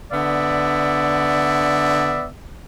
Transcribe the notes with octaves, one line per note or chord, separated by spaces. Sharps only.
D3 B3 D5 E5